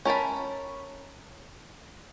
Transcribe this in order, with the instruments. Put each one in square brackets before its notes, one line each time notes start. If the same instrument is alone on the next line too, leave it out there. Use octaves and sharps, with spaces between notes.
[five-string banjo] C#4 A#4 A5 B5